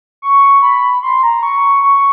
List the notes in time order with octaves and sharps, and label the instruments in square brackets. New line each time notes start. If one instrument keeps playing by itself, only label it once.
[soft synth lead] C#6
B5
C6
A#5
C#6
C#6